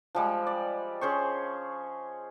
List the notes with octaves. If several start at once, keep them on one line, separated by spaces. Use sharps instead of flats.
F3 G3 G#3
D5
C#4 G#4 C5 C#6